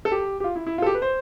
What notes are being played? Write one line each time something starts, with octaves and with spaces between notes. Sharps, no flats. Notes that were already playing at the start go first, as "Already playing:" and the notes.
A4
G4
G4
F4
E4
E4
F4
A4
G4
B4
C5